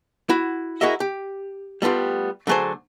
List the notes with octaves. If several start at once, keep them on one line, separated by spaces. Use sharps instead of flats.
E4 F#4
E4 F#4 G#4 A#4 D#5 E5
G4
G3 A3 B3 F4 G4
D3 F#3 A3 G#4 C5